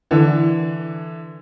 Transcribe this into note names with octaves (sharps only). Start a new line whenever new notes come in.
D3 E3